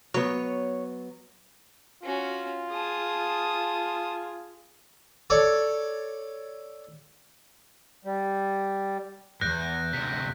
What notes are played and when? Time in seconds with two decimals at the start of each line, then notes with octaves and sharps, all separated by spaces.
0.14 F#3 B3 C#5
2.03 C#4 F4 F#4
2.72 G#4 A5 D#6
5.30 A4 C#5 D5
8.05 G3
9.41 E2 G2 F#6 G6 A#6
9.93 D2 C3 B6